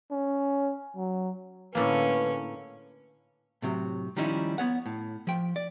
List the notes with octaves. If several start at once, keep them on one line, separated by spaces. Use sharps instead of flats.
C#4
F#3
A2 D3 A#3 C#4 B4
A2 C3 F#3
D#3 F3 G3 C#4 D#4 E4
B3 C#5 F#5
A2
F3 G5
D5